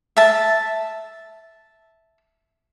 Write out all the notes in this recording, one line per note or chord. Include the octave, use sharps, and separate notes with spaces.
E5 A5